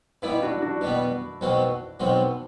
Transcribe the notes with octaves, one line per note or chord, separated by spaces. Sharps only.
B2 G3 B3 E4
E4
D4 F#4
D4 F#4
B2 G3 B3
B1 B2 F#3 C4
B1 B2 F#3 C4